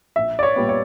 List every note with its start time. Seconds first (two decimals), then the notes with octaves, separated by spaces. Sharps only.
0.16 A#1 E5
0.39 D5
0.43 C#5
0.56 A#2 G3 B3
0.69 C#5